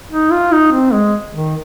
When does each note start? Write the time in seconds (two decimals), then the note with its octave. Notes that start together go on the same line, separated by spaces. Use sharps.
0.12 D#4
0.32 F4
0.52 D#4
0.73 C4
0.93 G#3
1.34 D#3